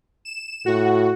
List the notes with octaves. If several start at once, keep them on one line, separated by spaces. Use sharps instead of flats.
E7
A2 F#4